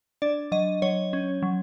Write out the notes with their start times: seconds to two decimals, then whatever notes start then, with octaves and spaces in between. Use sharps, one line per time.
0.22 D4 D5
0.52 F#3 D#5
0.82 F#3 C#5
1.13 C#4
1.42 F#3